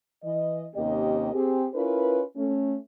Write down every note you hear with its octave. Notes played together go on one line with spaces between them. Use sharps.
E3 D#5
D#2 C3 A#3 C#4 G4 D#5
C4 G4 G#4
C#4 E4 F4 A#4 B4
A3 C#4